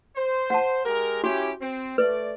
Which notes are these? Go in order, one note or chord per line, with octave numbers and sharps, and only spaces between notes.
C5
F#5 A5
G#3 G4 A#4
C#4 E4 F#4 G4
C4
A3 B4 D5